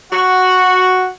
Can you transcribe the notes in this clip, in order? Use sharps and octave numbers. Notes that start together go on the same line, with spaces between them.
F#4